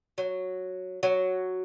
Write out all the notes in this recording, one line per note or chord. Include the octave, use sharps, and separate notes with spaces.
F#3
F#3